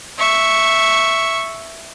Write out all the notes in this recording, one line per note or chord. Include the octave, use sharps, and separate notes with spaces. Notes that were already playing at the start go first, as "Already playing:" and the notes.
E5 C#6